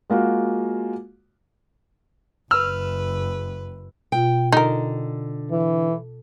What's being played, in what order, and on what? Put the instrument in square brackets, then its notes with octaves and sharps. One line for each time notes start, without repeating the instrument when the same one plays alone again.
[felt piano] G#3 A#3 F4 F#4
[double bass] F#1 [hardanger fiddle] B4 [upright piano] E6 [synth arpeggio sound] F6
[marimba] B2 F4 [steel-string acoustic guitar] G5
[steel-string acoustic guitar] D3 [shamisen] D#4 A#4
[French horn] E3